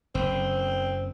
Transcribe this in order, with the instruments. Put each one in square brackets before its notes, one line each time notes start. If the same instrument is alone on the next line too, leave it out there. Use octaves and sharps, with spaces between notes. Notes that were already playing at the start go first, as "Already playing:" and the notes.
[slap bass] F#1 [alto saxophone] C4